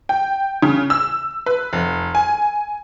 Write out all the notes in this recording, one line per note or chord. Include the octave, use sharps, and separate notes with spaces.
G5
C#3
E6
B4
F1
G#5